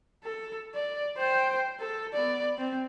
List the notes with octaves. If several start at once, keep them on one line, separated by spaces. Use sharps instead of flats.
A4
D5
C5 G5
A4
B3 D5
C4